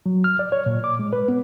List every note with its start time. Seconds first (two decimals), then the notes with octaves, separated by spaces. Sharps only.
0.06 F#3
0.24 F6
0.39 D5
0.52 C#5
0.66 A#2
0.84 D6
0.99 G#3
1.13 B4
1.28 B3